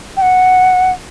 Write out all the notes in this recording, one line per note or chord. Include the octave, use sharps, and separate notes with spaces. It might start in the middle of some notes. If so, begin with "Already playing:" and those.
G5
F#5